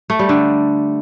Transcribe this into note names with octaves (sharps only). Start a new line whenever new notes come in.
A3
G3
D3